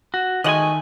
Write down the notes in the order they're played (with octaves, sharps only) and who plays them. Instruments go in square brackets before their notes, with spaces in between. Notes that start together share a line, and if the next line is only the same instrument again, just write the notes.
[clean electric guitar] F#4
[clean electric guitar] D#3 F#5 G#5 [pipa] G#3 A3 D#5